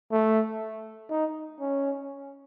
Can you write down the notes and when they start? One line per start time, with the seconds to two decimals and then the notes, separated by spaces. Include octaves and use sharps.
0.11 A3
1.10 D#4
1.61 C#4